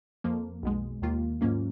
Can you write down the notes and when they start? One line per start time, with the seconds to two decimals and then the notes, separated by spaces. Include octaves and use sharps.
0.24 F2 F3 A#3
0.63 B1 B2 G#3
1.02 D#2 D#3 A#3 F4
1.41 G#2 F#3 A#3 C#4 F4